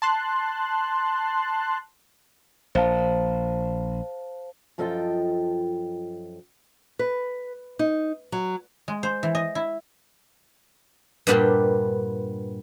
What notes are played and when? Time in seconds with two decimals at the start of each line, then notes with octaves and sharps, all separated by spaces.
0.02 A5 C6 F#6
2.75 A#1 C5 F5 A5
4.78 F#2 F3 F4 A4 D#5 G5
6.99 B4
7.79 D#4
8.32 F#3
8.88 G#3
9.03 C5
9.23 E3
9.35 D#5
9.55 E4
11.27 G2 A#2 B3 D4 G4